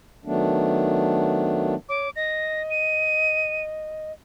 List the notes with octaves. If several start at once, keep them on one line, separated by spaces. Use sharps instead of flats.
D#3 F#3 A3 B3 D4
C#5 D6
D#5 A#6
D#7